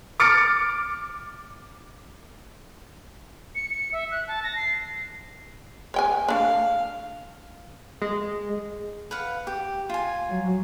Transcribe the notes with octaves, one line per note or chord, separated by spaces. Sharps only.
D6 F6 A6 C#7 D7
C#7
C#7
E5
F#6
A5
A#6
C7
C#5 G5 G#5
A3 D4 F5
G#3
B4 F5 F#5
G4
F4 G#5
F#3